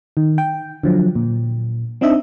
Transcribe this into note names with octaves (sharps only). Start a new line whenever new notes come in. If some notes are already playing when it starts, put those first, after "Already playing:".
D#3
G5
D3 F3 F#3
A#2
C4 D4 D#4 D#5 E5